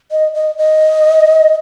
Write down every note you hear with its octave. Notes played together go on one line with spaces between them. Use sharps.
D#5
D#5
D#5